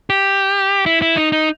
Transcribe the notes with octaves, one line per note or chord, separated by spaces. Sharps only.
G4
E4
E4
D#4
D#4